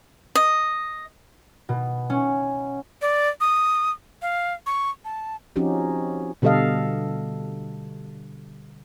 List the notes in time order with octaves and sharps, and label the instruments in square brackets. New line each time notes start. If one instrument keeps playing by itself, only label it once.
[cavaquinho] D#5
[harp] B2
C#4
[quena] D5
D#6
F5
C#6
A5
[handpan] F3 C4 C#4 D#4 F#4 G4
B2 D3 G3 A4 D#5 F5